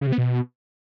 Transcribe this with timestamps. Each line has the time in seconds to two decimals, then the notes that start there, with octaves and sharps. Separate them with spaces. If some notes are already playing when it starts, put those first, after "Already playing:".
0.01 C#3
0.07 C3
0.12 B3
0.18 B2